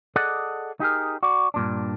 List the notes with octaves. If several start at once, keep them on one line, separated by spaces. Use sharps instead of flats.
G#4 A4 D5 D#5 F#5
D#4 G4 G#4 A#4
F#4 D5
G2 A#2 D4